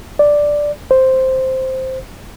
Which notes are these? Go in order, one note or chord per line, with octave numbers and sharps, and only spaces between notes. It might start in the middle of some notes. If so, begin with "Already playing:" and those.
D5
C5